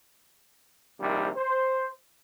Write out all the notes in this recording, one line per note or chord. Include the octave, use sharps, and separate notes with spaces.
A#1 C3 D#3 G3
C5